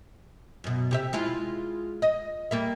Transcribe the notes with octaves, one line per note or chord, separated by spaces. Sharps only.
F#2 B2
C3 G4 E5
G#3 E4 F4
D#5
G3 A#3 E5